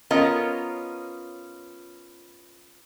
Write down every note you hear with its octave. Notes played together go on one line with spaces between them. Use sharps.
B3 C#4 F4 A#4 D#5 A#5